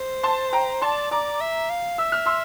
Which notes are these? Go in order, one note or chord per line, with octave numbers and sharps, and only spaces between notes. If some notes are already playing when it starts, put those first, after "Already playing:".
Already playing: C5
A5 C6
G5 A#5
D5 A5 C6
D5 A#5 D6
E5
F5
E5 E6
F6
C6 E6